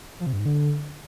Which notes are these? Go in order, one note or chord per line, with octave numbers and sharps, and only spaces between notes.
F3
C3
G2
G#2
D3